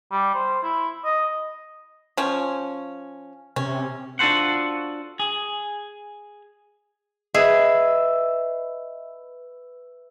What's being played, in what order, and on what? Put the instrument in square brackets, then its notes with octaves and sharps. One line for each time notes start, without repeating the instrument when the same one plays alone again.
[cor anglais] G3
C5
E4
D#5
[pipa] F3 C#4
[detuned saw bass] C3 [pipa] C#4
[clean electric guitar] D4 F4 F#4 A4 C5 F#5
G#4
[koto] G#4 [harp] B4 E5 [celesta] D#5